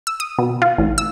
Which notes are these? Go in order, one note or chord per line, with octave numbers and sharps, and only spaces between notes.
E6
D#6
B2
F4
A1
E6